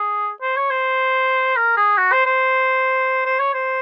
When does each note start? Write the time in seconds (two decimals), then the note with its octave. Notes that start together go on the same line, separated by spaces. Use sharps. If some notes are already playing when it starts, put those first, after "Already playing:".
Already playing: G#4
0.42 C5
0.57 C#5
0.71 C5
1.56 A#4
1.77 G#4
1.98 F#4
2.12 C5
2.26 C5
3.26 C5
3.39 C#5
3.54 C5